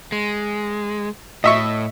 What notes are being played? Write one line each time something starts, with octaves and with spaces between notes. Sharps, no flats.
G#3
A2 D#5 E5 C#6